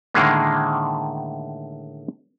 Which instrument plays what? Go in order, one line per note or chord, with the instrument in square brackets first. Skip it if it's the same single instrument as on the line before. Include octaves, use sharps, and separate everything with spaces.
[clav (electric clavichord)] A2 D3 D#3 G#3 A#3